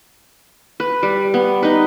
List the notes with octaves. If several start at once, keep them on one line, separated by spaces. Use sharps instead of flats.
B4
G3
B3
D#4 B4